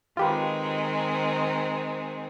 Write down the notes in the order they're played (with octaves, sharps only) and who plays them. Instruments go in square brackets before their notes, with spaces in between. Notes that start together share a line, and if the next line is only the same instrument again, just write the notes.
[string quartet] D#3 G#3 C4 [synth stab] F4 G4 B4